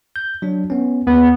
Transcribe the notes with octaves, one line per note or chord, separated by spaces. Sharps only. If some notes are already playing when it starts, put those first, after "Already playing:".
G6
F#3 D4
B3 C#4
D#2 B3